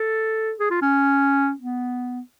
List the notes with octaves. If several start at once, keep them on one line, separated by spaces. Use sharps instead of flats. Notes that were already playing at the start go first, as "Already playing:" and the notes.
Already playing: A4
G#4
F4
C#4
B3